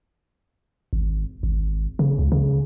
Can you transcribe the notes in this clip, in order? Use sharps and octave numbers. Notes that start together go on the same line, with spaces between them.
G#1
G#1
C#3
C#2
C#3